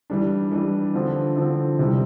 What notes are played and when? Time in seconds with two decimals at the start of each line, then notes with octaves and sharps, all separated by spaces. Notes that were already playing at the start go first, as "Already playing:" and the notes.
0.10 E3 G3 D4
0.51 E3 G3 D4
0.94 D3 F3 C4
1.37 D3 F3 C4
1.79 C3 E3 G3